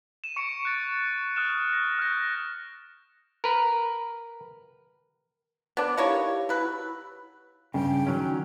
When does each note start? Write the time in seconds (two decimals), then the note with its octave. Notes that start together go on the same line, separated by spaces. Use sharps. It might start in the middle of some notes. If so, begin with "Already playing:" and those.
0.24 D#7 E7
0.36 C#6 C#7 D7 E7
0.65 F#6 A6
1.36 D#6 F6 F#6 E7
1.73 A#6
1.99 F6 G6 A#6
3.44 A#4 B4
5.77 B3 D4 A#4 D6
5.97 D#4 E4 G4 C#5 F5
6.49 B2 E4 B4 E6
7.74 G2 C#3 G5
8.07 D#3 F#3 C#4